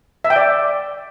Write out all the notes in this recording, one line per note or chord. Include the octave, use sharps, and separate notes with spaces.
E5
G5
D5